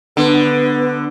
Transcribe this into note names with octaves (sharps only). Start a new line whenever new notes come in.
D3 B3